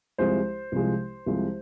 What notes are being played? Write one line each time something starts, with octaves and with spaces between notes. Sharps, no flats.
C2 C3 F3 G#3 C5
C2 C3 F3 G#3
C2 C3 F3 G#3